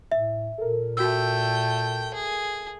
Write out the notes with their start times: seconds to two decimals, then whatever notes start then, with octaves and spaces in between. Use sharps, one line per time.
0.12 A2 E5
0.58 A#2 A4 A#4
0.97 A3 F#4 G5 E6
2.14 G#4